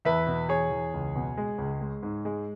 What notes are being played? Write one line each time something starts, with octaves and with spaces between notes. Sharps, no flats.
E2 B4 E5
B2
E2 G#4 C#5
E2
C#2
B2
G#3
C#2
G#3
G#2
G#3